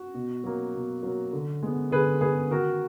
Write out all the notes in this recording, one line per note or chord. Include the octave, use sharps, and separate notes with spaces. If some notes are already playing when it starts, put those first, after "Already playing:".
Already playing: F#4
B2
F#3 A#3
B2
F#3 A#3
D3
G#3 B3
D3 G#4 B4
G#3 B3 G#4 B4
D#3 F#4 A#4